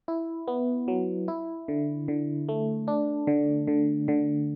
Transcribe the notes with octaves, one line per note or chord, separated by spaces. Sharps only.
E4
B3
F#3
E4
D3
D3
A3
D4
D3
D3
D3